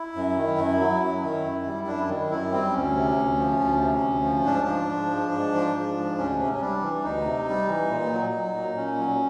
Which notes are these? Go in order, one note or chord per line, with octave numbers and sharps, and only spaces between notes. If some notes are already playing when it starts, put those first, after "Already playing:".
Already playing: E4
F#2
D#3
F#2
F#3
F#2
D#3
F#2
G3
F#2 D4
D#3
F#2 E4
G3 C4
D2 C#4
C3
D2
F3
D2
C3
D2
F3
G#2 D4
F3
F3
G#2
G#2
F3
F3
G#2
D2 C#4
C3
C#4
G3 D4
E3
D2 D#4
C3
G3
E3
A#2
F#3
F#3
A#2
A#2 C#4
F#3